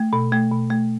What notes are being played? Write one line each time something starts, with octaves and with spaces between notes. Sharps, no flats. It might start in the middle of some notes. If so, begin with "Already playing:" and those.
Already playing: A3
B2
A3
B2
A3